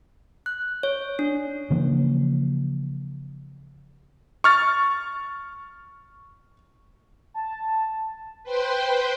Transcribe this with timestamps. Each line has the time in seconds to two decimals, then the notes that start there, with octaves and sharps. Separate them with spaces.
0.46 F#6
0.83 C#5
1.19 D4
1.70 C#3 E3 F3 A#3
4.44 C#6 F6 A6
7.34 A5
8.44 B4 C5 G5 C6